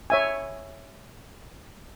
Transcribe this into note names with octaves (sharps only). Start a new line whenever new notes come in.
C#5 E5 G#5